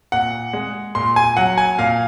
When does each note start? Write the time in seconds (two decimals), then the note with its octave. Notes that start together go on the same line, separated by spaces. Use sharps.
0.12 A#2 F#5
0.53 G#3
0.95 A#2 C6
1.16 G#5
1.37 F#3 F#5
1.58 G#5
1.78 A#2 F5